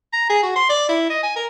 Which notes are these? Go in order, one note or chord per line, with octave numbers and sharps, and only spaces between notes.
A#5
G#4
F#4
C6
D5
E4
D#5
G#5
A#4